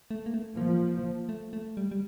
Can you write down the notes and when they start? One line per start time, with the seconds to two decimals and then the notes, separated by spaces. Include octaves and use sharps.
0.11 A3
0.26 A#3
0.34 A3
0.57 F3 A#3
1.29 A3
1.53 A3
1.77 G3
1.91 G3